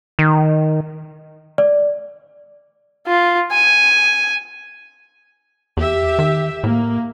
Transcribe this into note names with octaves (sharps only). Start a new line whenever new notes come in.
D#3
D5
F4
G#5
E2 G4 E5
D#3
A2 A#3